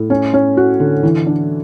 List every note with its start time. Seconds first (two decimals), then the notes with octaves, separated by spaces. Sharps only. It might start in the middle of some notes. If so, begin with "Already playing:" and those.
Already playing: A2
0.10 C#4
0.34 C#4
0.57 F#4
0.80 D3
1.03 E3
1.26 D4